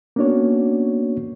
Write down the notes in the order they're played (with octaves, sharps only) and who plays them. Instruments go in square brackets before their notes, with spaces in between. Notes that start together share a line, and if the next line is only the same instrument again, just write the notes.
[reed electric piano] A#3 B3 C#4 D4 F#4 C#5